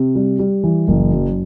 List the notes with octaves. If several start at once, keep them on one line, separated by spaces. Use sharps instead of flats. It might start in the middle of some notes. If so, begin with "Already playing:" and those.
Already playing: C3
G3
G3
E3
F#1
F#2